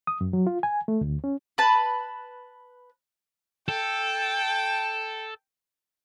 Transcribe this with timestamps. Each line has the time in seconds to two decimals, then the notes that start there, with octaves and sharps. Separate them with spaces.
0.07 D#6
0.21 F#2
0.33 F#3
0.47 F4
0.63 G#5
0.88 A3
1.01 D2
1.24 C#4
1.58 B4 A5
3.68 A4 G5